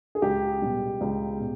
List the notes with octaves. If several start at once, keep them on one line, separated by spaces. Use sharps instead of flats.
G#4
C#2 G4
B2 G3
C#2
B2